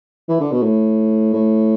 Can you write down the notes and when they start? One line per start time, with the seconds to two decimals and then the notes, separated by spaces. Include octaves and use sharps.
0.29 E3
0.40 D3
0.51 B2
0.63 A2
1.33 A2